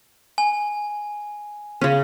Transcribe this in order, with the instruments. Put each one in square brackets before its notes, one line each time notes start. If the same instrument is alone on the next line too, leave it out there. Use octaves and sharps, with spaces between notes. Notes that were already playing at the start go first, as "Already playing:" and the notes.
[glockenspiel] G#5
[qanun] C#3 C#4